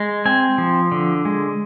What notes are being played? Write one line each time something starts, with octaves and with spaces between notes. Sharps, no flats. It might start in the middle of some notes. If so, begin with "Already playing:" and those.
Already playing: G#3
C4 G#5
F3
D3
G#3